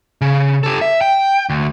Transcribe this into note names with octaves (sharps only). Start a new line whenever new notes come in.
C#3
G4 A4
E5
G5
D2